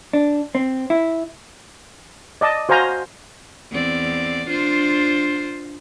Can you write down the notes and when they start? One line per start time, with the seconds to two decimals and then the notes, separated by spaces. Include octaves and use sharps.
0.13 D4
0.55 C4
0.90 E4
2.41 D5 D#5 A5
2.69 F#4 C5 F5 G#5 A#5
3.71 E2 C4 D5
4.47 D4 F4 C5